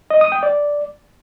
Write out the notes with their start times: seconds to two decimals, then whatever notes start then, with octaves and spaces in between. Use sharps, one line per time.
0.10 D#5
0.21 D#6
0.32 G5
0.43 D5